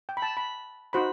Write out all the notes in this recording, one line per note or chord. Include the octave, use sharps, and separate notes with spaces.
G5
B5
A5
B5
D#4 F#4 C5 B5